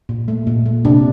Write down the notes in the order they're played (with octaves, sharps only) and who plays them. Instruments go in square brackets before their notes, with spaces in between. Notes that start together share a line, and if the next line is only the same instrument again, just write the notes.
[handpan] A#2
A3
A#2
A3
C3 D4